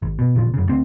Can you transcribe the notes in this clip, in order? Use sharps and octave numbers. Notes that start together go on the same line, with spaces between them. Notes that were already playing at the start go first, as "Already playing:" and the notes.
G#1
B2
G#1 A#2 C#3 F3
F#2 C#3
D2 C4